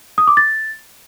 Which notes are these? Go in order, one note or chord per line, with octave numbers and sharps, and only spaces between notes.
D#6
D6
A6